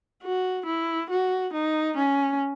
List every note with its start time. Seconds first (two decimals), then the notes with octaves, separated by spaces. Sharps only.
0.23 F#4
0.66 E4
1.10 F#4
1.53 D#4
1.97 C#4